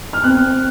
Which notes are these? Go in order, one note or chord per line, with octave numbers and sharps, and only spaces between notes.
F6
C4 F#6